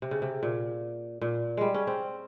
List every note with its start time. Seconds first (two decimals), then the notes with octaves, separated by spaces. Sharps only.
0.02 C3
0.11 C#3
0.22 C3
0.43 A#2
1.21 A#2
1.57 G3 G#3
1.74 C#4
1.87 C4